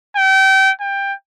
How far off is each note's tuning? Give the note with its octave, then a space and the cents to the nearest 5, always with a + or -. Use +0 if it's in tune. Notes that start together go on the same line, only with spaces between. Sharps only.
G5 -30
G5 +15